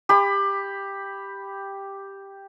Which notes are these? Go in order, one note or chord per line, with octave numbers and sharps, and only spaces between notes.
G4 B5